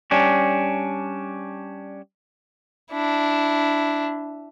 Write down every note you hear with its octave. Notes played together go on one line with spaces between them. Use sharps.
G3 C#4 D4
D4 E4